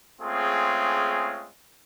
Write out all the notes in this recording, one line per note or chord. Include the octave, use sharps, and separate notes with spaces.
G#3 A3 C4 C#4 F4 G#4